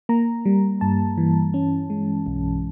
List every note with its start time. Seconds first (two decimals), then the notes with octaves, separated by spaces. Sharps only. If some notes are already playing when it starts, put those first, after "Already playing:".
0.09 A#3 A#5
0.46 G3
0.81 G2 A5
1.18 E3
1.54 C#4
1.90 G#3
2.26 B1